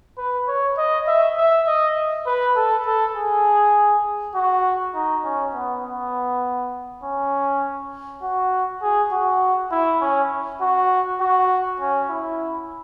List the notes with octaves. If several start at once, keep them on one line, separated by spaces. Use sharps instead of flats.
B4
C#5
D#5
E5
E5
D#5
B4
A4
A4
G#4
F#4
D#4
C#4
B3
B3
C#4
F#4
G#4
F#4
E4
C#4
F#4
F#4
C#4
E4